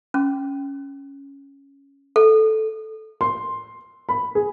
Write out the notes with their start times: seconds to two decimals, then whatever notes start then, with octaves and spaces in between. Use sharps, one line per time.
0.14 C#4
2.16 A4
3.21 C6
4.09 B5
4.35 G#4